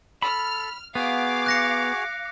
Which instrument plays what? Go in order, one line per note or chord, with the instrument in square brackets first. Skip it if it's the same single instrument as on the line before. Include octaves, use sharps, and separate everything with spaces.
[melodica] A4 [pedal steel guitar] B5 [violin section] F6
[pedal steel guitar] B3 [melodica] F#4 G#4 [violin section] F5 D6
[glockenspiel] F#6 A#6 C#7